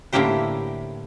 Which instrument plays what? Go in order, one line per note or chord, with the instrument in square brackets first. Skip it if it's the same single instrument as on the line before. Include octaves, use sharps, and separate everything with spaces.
[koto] A2 D3 A#3 E4 G4 C5